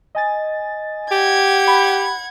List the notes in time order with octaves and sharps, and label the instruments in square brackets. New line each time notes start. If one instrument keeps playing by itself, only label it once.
[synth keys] D#5 G#5 A6
[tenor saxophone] G4 [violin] F#5 G#6
[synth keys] B5